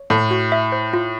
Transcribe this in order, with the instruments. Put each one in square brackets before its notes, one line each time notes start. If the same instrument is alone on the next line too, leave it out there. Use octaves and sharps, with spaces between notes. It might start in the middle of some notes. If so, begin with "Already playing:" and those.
Already playing: [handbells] C#5
[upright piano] A2 [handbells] A4
[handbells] F#4
E5
C5
F4